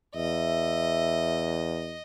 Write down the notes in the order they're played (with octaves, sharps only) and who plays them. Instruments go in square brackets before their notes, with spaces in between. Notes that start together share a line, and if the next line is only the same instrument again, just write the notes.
[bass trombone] E2 [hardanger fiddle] D#5 [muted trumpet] E5